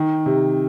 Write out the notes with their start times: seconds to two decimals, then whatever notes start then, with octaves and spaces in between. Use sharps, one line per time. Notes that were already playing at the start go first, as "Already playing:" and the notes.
Already playing: D#3
0.26 C3